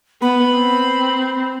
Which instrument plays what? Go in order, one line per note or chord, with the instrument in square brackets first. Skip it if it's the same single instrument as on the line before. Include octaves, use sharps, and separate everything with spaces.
[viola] B3 [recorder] B5
[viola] C4